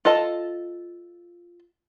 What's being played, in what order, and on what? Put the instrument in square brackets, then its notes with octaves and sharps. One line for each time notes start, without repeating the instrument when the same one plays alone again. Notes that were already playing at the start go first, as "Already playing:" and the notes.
[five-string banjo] F4 A4 D#5 A5